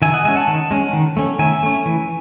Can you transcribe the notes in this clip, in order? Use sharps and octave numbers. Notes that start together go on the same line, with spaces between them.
D#3 E5 G#5
D#5 F#5
G#3 C#4 E5 G#5
F#5 A5
D#3
G#3 C#4
D#3
A3 C#4
D#3 E5 G#5
A3 C#4
E3